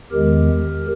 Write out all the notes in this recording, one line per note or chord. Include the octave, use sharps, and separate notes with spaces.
E2 D#3 G#3 G4 A#4